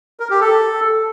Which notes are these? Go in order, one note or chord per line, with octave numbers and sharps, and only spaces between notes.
A#4
G4
A4